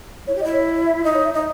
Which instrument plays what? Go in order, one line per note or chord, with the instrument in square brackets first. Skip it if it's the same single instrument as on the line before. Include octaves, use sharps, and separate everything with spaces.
[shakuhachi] E4 [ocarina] C#5
[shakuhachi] G4
[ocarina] D#5
[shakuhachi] E4
[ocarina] C#5
E5
[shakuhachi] D#4 [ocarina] D#5
[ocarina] C#5
E5
[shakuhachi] D#4 [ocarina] D#5